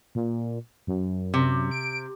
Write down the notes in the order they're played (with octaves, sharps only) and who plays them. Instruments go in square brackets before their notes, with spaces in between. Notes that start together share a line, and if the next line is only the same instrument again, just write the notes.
[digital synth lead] A#2
F#2
[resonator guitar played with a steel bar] C3
[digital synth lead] D7